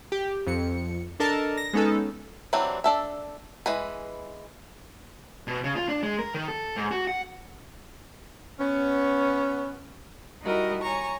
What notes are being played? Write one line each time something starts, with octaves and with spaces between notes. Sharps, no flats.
G4
F2 C#7
D4 A4 A#4 D#5 A5
A#6
G#3 B3 C#4 D#4 A4
E3 F#3 G3 C4 D4
D4 A4 E5
E3 G#3 B4
B2
C#3
F4
D4
G#3
A#4
D#3
A4
G#2
F#4
F#5
B3 C#4
G3 D#4 E4 F#4 A#4 D#5
C#5 G#5 A#5 C#6